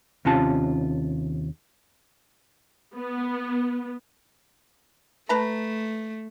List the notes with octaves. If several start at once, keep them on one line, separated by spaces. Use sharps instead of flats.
D#2 C3 C#4 F4 A5
B3
A3 B4 A5 A#5